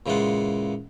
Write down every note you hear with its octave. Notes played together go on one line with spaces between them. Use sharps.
A#2 C#3 E3 G#3 F4 F#5